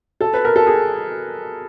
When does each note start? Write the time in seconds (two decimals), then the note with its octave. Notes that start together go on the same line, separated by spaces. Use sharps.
0.21 A4
0.34 B4
0.45 A#4
0.56 A4
0.67 G#4